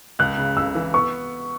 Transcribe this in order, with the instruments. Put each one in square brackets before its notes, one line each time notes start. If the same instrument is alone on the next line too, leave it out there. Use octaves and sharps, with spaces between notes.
[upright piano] C#2 [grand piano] F#6
[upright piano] C#3
[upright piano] C#2 [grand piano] E6
[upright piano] E3
[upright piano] B3 [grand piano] C#6